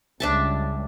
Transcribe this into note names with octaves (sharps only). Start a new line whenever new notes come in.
C#2 C#3 G3 D4 E5 A5